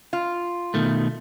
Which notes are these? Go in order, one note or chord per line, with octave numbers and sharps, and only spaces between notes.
F4
B2 D#3 A3